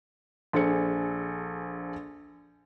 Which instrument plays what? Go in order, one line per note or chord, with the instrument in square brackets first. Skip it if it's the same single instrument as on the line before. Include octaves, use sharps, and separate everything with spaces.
[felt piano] A#1 G#4 A4 C5 G#5 C#7